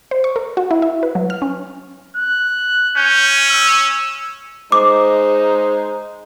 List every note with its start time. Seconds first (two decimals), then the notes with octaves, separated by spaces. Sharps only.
0.11 C5
0.24 C#6
0.36 A#4
0.57 F#4
0.71 E4
0.82 E5
1.03 B4
1.15 F#3
1.30 F6
1.42 C#4
2.17 F#6
2.97 C#4 G6
3.49 E6
4.72 G#3 D#4 C5 D6